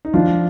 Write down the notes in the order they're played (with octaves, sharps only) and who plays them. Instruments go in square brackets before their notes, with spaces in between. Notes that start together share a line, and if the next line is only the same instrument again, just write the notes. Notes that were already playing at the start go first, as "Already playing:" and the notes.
[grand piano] D#4
[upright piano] F3 [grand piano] D4 F4